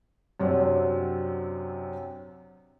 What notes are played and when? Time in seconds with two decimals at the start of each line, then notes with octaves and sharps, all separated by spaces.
0.40 F#2 C3 F#3 C4 D4